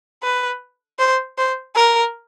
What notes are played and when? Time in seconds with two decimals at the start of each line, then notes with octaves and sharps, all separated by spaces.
0.23 B4
0.99 C5
1.38 C5
1.76 A#4